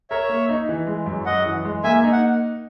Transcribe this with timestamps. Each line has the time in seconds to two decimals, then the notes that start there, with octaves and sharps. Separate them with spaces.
0.11 A#4 C#5 E5
0.29 A#3
0.49 D#4
0.69 E3
0.87 G#3
1.06 F#2
1.26 F#2 D#5 F#5
1.46 E3
1.65 G#3
1.84 A#3 E5 G#5
2.04 D#4
2.12 F#5